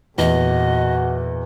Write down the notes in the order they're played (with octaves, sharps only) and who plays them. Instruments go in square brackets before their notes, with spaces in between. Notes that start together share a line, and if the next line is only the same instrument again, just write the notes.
[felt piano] E2 [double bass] A#2 [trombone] F#4 [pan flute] D#5